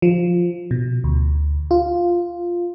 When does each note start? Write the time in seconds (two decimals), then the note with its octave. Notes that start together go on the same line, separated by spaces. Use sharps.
0.02 F3
0.71 B2
1.04 D2
1.71 F4